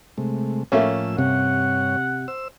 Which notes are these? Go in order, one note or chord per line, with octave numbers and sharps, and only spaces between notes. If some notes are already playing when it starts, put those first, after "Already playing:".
C3 G#3 A3
A2 F3 A3 A#3 C#4 E6
G2 C3 C#5 F#5
C5 E6